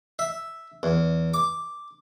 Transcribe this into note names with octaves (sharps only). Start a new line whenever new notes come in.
E5
E2
D6